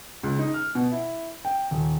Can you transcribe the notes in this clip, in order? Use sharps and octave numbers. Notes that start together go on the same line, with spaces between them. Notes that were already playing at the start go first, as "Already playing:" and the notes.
C#2
D#4
F6
B2
E4
G5
D#1